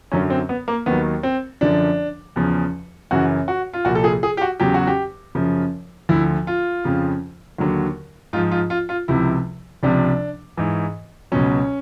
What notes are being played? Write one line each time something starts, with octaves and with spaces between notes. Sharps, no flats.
F#2 D3 F#3 C#4
C4
B3
A#3
D#2 D#3 F#3 B3
C4
F#2 D3 F3 D4
E2 C#3 F3
F#2 C#3 E3 F#4
F#4
F4
C2 A#2 F3 F#4
A4
G#4
G#4
G4
F#4
E2 C#3 F#3 G4
F#4
G4
F#2 C#3 F3
D2 D3 F3 E4
F4
F2 C#3 F3
D#2 D3 F#3
G#2 F3 F4
F4
F4
F4
C#2 C3 F3 E4
C#2 C3 F3 D4
G#2 E3
C#2 B2 F#3 C#4